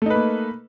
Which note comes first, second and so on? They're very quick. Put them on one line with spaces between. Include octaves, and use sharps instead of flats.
A3 D#4 B4 A#3